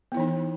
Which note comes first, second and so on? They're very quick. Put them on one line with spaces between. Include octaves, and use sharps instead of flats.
B3 E4 E3 D#4